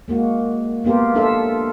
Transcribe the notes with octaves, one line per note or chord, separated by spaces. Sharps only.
G#3 A#3 F#4
A#3 B3 F4 G4 A#4
D4 F4 A4 A#4 E5